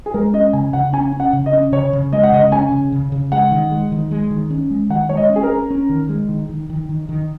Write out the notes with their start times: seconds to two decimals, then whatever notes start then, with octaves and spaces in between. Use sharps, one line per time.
0.06 G#4
0.14 G#3 A#4
0.33 C#4 D#5
0.53 C#3 G#5
0.73 C#3 F#5
0.93 C#4 G#5
1.13 C#4
1.20 F#5
1.33 C#3
1.46 D#5
1.53 C#4
1.72 C#3 C#5
1.93 C#3
2.12 G#3 D#5
2.23 F#5
2.32 C#3 D#5
2.52 C#4 G#5
2.72 C#3
2.92 C#3
3.12 C#3
3.32 G#3 F#5
3.52 D#3
3.71 G#3
3.92 D#3
4.11 G#3
4.31 D#3
4.50 C#4
4.70 G#3
4.90 D#3 F#5
5.09 G#3 C#5
5.17 D#5
5.30 C#4
5.36 G#4
5.43 A#4
5.50 C#4
5.70 C#4
5.89 D#3
6.09 G#3
6.29 D#3
6.49 D#3
6.70 D#3
6.89 D#3
7.09 D#3